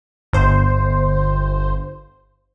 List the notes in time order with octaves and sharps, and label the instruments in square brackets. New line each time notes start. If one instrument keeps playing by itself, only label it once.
[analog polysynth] G1 C5